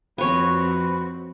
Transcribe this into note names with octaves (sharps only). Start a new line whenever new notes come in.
F2 C4 F#4 B4 C#5 G#5